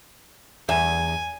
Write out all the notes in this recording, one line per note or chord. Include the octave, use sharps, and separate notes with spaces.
E2 E5 G#5